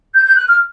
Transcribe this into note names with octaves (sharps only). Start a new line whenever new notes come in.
G6
G6
F#6
F6